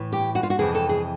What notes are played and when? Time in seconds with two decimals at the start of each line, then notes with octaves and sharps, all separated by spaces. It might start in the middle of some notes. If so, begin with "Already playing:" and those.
Already playing: A2 E3
0.12 G4
0.35 F#4
0.43 F4
0.50 F#4
0.59 F2 C3 E3 G#4
0.75 A4
0.89 G#4